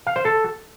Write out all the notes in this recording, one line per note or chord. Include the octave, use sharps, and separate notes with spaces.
F5
C5
A4